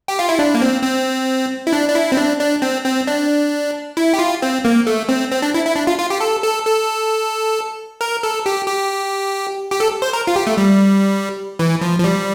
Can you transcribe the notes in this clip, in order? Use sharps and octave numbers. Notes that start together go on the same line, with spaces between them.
G4
F4
E4
D4
A#3
C4
C4
E4
D4
D4
E4
C4
D4
D4
C4
C4
D4
E4
G4
F4
C4
A#3
A3
C4
C4
D4
E4
E4
D4
F4
F4
G4
A4
A4
A4
A#4
A4
G4
G4
G4
A4
C5
A#4
F4
G4
A3
G3
E3
F3
F3
G3